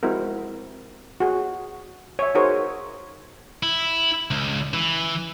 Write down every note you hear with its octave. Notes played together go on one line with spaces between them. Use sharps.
G#3 C4 E4 F#4 A#4
F#4 G#4
C#5 E5
D#4 F#4 G#4 A#4 C5 C#5
E4
C#2
E3